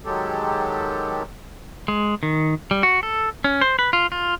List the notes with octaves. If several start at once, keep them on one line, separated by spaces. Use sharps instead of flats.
D#3 F#3 G#3 G4 A4
G#3
D#3
G3
F#4
A4
C#4
C5
B4
F4
F4